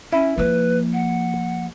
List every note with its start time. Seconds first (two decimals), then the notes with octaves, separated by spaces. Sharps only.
0.12 C#4 E4
0.38 F3 A#3 B4
0.93 F#5